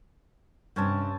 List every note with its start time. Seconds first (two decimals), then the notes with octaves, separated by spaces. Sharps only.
0.76 G2 C3 C4 C#4 A5